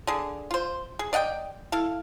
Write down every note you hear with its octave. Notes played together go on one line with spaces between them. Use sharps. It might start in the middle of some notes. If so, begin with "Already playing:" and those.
D3 G#4
F4 C5
G#4
D5 D#5 F#5 G5
E4 A4 F5